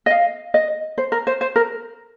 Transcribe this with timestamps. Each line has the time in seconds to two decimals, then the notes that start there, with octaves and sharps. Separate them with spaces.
0.06 D#5
0.11 F5
0.54 D#5
0.98 C5
1.12 A#4
1.27 C5
1.41 C5
1.56 A#4